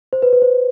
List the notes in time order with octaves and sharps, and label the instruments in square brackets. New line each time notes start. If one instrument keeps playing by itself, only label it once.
[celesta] C5
B4
B4
C5